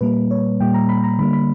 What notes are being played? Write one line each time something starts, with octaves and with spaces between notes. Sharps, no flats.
A#2 G3 A#3 B4
C#5
A#2 G3 A#3 G5
A#5
B5
A#5
D3 G3 A#3 B5
B5